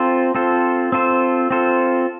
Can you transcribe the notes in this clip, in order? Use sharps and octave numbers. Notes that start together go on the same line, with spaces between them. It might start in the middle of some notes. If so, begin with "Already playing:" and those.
Already playing: C4 F4 A4 C5
C4 F4 A4 C5
C4 F4 A4 C5
C4 F4 A4 C5